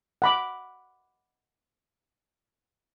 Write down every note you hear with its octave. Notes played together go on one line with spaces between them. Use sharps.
F#5 B5 D6